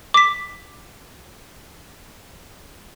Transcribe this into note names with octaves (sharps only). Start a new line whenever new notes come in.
D6 B6